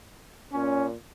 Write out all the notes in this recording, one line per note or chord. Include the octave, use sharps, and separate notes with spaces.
A#2 C#4